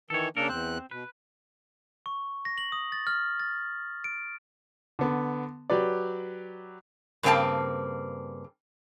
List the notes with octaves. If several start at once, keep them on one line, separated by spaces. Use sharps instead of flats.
D#3 E3 A4 C#5
C#3 A#3 D4 A4 A#4
E2 C4 F#6
B2 B4
C#6
A#6
F#7
D#6
A6
F6
A6
D7
D3 B3
F#3 G4 B4 D5
G2 C#3 A#3 C4 G5 A5